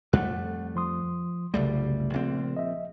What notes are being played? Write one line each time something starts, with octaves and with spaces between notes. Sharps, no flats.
F2 G3 A3 F#5 F#6
F3 C6 D#6
F#1 C2 C#3 G3 A3 D5
A#1 C4
D#5 E5